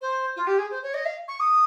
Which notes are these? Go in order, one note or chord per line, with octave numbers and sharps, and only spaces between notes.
C5
F4
G4
G#4
C5
C#5
D#5
F5
C#6
D#6